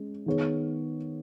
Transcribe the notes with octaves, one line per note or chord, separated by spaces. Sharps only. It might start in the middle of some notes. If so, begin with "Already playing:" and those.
Already playing: G#3 C#4
D#3 B3 G#4 C#5